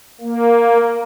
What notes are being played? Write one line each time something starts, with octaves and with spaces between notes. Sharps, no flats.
A#3